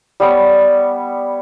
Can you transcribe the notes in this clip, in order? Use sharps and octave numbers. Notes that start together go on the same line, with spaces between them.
G3 B3 C#5